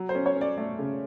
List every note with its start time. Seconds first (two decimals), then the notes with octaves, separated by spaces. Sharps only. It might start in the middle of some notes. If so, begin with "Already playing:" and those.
Already playing: F#3
0.09 C5
0.15 C#4
0.26 C#5
0.36 C#4
0.41 D5
0.57 A3 D5
0.79 C#3